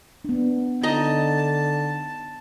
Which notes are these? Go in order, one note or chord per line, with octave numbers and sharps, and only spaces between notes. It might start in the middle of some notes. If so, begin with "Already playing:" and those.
B3 D4
D3 D#4 D#5 A5 A#5